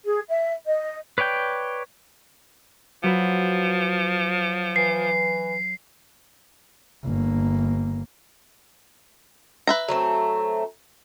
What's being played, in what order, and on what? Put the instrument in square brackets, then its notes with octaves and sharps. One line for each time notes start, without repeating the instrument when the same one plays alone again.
[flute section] G#4
E5
D#5
[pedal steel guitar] B4 C#5 D5 G5 G6
[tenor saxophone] F3 [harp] F#3 B4
[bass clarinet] E3 [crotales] C7
[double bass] G1 A#3
[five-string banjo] B4 E5 A#5
[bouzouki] F#3 A3 C4